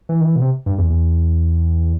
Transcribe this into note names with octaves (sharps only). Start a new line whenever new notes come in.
E3
D#3
E3
B2
C3
G2
E2
E2